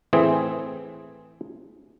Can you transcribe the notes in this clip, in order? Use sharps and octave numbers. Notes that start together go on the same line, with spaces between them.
A2 E3 C4 G#4